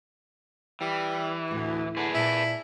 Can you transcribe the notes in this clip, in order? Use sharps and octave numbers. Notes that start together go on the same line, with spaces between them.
E3 G3
D2 A2
D3 G#4 B4
A#2 E4 A5